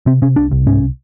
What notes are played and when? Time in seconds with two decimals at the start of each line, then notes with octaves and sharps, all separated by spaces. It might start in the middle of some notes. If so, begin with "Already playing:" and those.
0.06 C3 C4
0.22 C3 C#4
0.36 C2 D4
0.52 C2
0.67 G#2 C#4